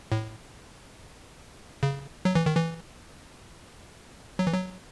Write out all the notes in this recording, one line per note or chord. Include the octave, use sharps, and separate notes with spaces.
A2
C#3
F#3
E3
D#3
E3
F#3
E3
F#3